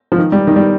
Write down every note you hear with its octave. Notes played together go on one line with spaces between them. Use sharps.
F3
D#3
G3
D#3
G3